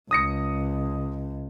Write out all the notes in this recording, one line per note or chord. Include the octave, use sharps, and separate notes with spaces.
C#2 D#6 A#6 C#7